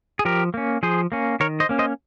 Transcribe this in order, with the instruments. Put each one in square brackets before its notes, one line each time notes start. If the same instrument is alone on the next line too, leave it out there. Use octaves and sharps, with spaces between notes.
[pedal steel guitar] G#4
F3 G4 A#4
A#3 C#4
F3 G#4 C5
A#3 C#4
D#3 A#4 C#5
C5 D#5
A#3 C#4
C5 D#5